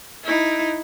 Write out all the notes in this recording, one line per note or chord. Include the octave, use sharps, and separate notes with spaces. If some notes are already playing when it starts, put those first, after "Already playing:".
D#4 E4